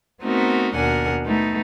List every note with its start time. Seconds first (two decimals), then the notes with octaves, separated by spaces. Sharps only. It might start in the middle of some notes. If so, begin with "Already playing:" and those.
0.22 A3 B3 C4 D#4 F#4 A#4
0.75 D#2 B2 D4 A#4 F#5 G#5
1.25 A3 B3 D#4